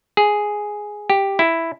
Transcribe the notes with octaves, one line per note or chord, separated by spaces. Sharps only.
G#4
G4
E4